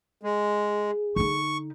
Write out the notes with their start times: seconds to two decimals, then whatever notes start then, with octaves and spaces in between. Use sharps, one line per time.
0.23 G#3 G#4
1.16 D3 D#4 C#6